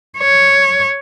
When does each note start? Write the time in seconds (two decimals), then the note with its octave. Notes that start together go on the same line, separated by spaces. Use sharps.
0.18 C#5